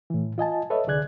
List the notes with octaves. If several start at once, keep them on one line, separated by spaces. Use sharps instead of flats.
A2 E3
F4 D#5 G#5 A5
A4 B4 C#5 D#5 E5
C2 D3 G#4 D5 F#6 G#6